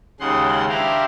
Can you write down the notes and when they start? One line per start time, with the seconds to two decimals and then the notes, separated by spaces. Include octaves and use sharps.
0.20 D#2 C#3 G#3 F#5 C6
0.69 D4 E4 G4 A#4 C5 F5